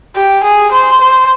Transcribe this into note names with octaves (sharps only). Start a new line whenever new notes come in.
G4
G#4
C5
C5